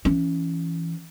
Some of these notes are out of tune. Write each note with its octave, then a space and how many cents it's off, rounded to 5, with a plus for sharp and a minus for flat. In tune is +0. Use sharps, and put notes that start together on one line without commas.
E3 +10 C#4 +5